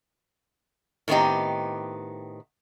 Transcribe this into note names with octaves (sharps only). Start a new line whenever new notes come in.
A2 D#3 B3 C4 D#4 G4